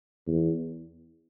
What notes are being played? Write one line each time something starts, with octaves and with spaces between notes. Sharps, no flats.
E2